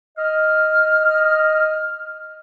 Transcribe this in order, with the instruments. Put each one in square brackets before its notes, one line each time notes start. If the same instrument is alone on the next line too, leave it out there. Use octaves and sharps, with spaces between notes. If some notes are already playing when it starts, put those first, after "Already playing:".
[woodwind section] D#5 F6